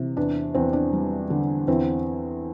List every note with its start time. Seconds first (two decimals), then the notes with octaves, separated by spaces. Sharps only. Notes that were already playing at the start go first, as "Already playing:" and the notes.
Already playing: C3 E3
0.17 E2 D4
0.55 E2 C4
0.73 D4
0.93 G3
1.30 D3
1.67 E2 C4 E4